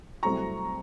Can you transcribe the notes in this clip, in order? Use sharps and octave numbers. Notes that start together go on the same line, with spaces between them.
C2 C3 F#3 A3 C4 A#5 C#6